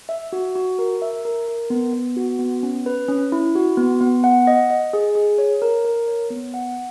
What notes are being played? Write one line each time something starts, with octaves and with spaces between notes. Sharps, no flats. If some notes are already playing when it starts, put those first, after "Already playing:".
E5
F#4
F#4
A#4
E5
A#4
A#4
B3
B3
F#4
B3
C#4
B4
C#4
E4
F#4
B3
B3
F#5
D#5
D#5
G#4
G#4
C#5
A#4
A#4
C#5
B3
F#5